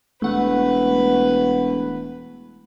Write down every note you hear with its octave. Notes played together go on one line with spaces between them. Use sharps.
E1 A3 B4 F#5